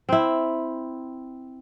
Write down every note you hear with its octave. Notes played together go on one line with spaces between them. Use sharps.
C4 E4